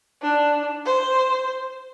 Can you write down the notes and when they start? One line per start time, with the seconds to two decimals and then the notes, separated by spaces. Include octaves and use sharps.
0.22 D4
0.85 C5